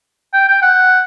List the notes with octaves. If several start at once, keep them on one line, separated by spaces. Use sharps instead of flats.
G5
G5
F#5